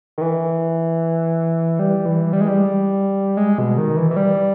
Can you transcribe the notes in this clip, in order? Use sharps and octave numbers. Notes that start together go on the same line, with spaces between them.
D#3
E3
G3
E3
G3
G#3
G3
G#3
B2
D#3
E3
E3
G3